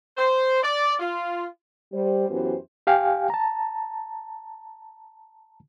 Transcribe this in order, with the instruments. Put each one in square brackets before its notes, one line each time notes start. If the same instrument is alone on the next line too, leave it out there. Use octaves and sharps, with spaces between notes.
[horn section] C5
D5
F4
[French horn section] G3 C5
F#2 E3 B3 F#4 G4 C5
[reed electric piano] G4 F5 G5 G#5
A5 A#5